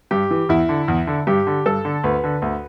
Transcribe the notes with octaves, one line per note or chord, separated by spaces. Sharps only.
G2 G4
E3
E2 E4
D3
E2
D3
G2 G4
D3
G2 A4
D3
D2 B4
D3
D2